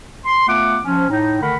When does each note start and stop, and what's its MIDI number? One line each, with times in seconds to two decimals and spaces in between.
0.25 0.44 84
0.48 0.78 57
0.48 0.78 59
0.48 0.78 65
0.48 0.78 78
0.48 0.78 86
0.84 1.06 53
0.84 1.06 61
1.10 1.37 45
1.10 1.37 63
1.41 1.55 50
1.41 1.55 51
1.41 1.55 57
1.41 1.55 70
1.41 1.55 78
1.41 1.55 83